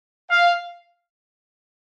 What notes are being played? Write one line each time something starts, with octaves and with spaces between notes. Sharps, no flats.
F5